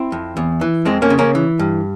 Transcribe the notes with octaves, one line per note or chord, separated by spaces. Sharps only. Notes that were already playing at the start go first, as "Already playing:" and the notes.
Already playing: C4 E4
F2
E2
E3
F2 G#3 C4
A#3 C#4
C#3
A#3 C#4
E3
G2